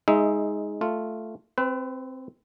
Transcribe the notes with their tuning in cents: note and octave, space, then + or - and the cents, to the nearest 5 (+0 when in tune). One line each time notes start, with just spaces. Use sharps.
G#3 +0 D#4 +15 E5 +0
A3 +0 F4 +0
C4 +0 B4 +35